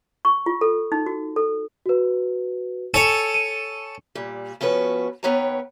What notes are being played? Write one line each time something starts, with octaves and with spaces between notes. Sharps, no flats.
C#6
F4
A4
D#4
F#4
A4
F#4 B4
A4 C#5 G#5
D#7
A#2 G3
F3 B3 C#4 F#4 B4
D#2 B3 B4 C#5 G5 A#5